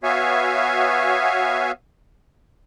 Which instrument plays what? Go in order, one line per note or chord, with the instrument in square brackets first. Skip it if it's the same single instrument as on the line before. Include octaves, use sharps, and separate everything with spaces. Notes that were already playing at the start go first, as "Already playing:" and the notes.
[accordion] B3 F#4 C#5 E5 F5 G#5